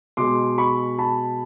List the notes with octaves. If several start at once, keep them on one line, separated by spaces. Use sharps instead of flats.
B2 G#3 C6 D6
B5 C#6
A5 B5